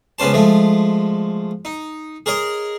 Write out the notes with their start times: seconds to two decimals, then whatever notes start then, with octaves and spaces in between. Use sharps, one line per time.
0.19 C#2 B3 C#4 C5 A5
0.33 F3 G#3 A3
1.65 D#4
2.26 G#4 A#4 C#5 D#5